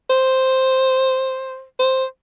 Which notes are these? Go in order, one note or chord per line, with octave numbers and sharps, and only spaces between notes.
C5
C5